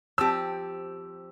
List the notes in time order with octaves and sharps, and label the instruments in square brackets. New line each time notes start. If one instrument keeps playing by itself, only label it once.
[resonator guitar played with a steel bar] F3 C4 G4 [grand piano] E6